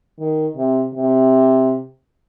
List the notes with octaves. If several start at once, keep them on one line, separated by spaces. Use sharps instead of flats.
D#3
C3
C3